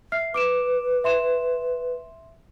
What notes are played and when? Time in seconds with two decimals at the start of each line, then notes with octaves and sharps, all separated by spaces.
0.12 E5 F6 C7
0.34 B4 D6 D7 E7
1.04 E5 C6 E7